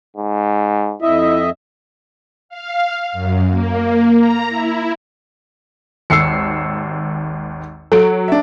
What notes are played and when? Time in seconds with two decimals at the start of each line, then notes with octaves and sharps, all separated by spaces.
0.17 G#2
1.02 F2 E4 D#5 E5
2.49 F5
3.13 F#2
3.50 A#3
4.17 A#5
4.49 E4
6.10 G#1 D#2 E6 C7 C#7
7.92 F#3 A4 D7
8.28 D4 E5